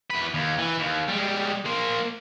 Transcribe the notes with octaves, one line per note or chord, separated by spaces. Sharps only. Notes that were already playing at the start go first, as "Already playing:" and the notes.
E2 B4
D#2
E3
D#2
G3 G#3
A#3 C5